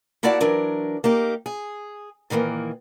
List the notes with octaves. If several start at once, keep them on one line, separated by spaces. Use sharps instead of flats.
A#3 E4 F#4 D5 F#5 A5
E3 F#3 D4 A#4
A#3 D#4 G4
G#4
A#2 D#3 E3 A3 A#3